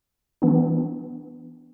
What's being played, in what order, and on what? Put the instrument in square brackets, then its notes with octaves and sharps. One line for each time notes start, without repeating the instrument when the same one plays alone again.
[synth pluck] E3 B3 D4